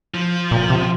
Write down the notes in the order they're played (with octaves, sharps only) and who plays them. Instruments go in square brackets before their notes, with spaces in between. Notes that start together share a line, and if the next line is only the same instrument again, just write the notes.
[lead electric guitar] F3
[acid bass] A#2
C3